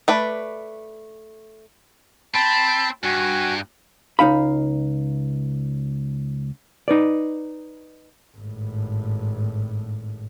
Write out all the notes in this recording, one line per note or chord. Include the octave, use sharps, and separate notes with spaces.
A3 B4 D5
C4 A5 B5
G2 F#4 G#5
C#2 D#4 F5 B5
D#4 B4 D5
G#1 A2